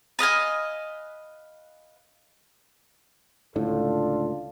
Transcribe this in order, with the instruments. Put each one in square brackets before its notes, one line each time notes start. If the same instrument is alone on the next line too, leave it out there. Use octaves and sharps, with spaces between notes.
[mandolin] B4 D#5 F5 G#5
[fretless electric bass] C#2 A2 D3 [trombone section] D4 F4 A4